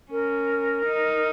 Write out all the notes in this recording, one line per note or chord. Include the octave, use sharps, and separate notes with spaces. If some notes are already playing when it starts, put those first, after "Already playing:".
C#4 A#4
D#4